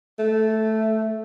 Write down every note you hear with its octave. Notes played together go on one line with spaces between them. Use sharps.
A3